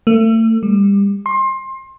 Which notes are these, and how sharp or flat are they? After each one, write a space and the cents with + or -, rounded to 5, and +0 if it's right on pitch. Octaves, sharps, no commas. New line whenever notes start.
A3 +35
G3 +30
C6 +25